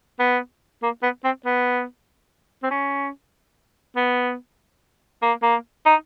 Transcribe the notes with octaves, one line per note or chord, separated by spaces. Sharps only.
B3
A#3
B3
C4
B3
C4
C#4
B3
A#3
A#3
D#4